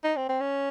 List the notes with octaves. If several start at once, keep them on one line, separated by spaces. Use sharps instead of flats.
D#4
C4
C4
C#4